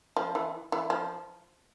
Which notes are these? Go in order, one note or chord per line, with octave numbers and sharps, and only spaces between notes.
F3
E3
E3
F3